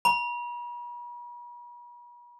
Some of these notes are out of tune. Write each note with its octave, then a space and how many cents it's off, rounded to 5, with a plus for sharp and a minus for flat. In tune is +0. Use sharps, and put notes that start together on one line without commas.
B5 -45